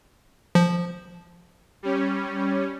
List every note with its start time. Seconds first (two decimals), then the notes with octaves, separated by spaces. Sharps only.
0.55 F3
1.83 G3 C#4